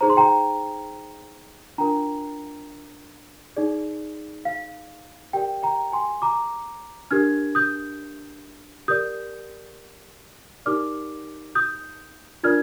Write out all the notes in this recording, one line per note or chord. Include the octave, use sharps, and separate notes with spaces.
D#4 G#4 C5 A#5
C6
G5 A#5
D4 F4 A#4 G5 A#5
D#4 G#4 D5
F5
G4 A#4 D5 G5
G5 A#5
G#5 C6
A#5 D6
D4 G4 A#4 F6 G#6
D#6 G6
G4 A#4 D5 D#6 G6
D#4 G4 A#4 D5 D6 F6
D#6 G6
D4 F4 A#4 D5 F6 G#6